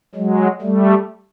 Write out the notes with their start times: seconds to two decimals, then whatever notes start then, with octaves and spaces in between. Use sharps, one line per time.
0.15 F#3 G#3
0.61 G3 A3